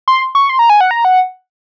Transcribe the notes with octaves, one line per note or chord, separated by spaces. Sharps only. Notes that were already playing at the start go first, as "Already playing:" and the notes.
C6
C#6
C6
A#5
G#5
F#5
A#5
F#5